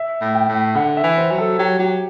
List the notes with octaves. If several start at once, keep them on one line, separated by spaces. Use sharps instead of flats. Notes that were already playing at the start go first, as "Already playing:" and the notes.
Already playing: E5
A2
G5
A2
D3 F#5
E5
E3
C5
F#3
A4
F#3 G4
F#3 G4